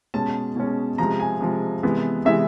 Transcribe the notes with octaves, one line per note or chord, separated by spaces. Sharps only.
B2 G#3 C#4 A5
B2 G#3 C#4
C3 F3 G#3 A#5
G#5
C3 F3 G#3
C3 E3 G#3 B3
C3 E3 G#3 B3 E5